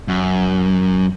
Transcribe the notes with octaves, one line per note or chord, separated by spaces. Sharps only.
F#2